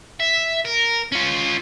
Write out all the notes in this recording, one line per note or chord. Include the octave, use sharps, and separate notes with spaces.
E5
A#4
C#4 F4